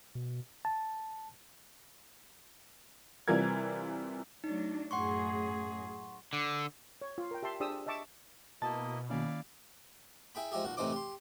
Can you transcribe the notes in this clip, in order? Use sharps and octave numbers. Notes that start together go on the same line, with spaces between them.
B2
A5
C3 E3 G3 F4 A#4 G#6
F#3 A3 D4 D#4
F#2 A2 G#4 F#5 C6 C#6
D3
C#5
F4
A#4 G5
G4 E5 A5 C6
D4 G4 G#4 C5 D#6 E6
D#5 E5 A5 C#6 D6
B2 A#3 E4 D#5 A5
D#3 A#3 C#4 E4 D5 F5
E4 G#4 G5 B5
F3 G#3 E4 G4 G#4
B1 A#2 F#4
A2 C3 E3 D#4 C5 D6
G4 C6